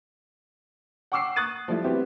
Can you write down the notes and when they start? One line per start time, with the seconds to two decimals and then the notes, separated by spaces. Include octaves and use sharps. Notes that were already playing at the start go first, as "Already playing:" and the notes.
1.12 F#5 G5 C#6 D6 E6 C7
1.36 C#6 D#6 F#6 A6 D#7
1.68 F3 G3 A3 E4
1.84 G3 B3 C4 E4 F#4 G4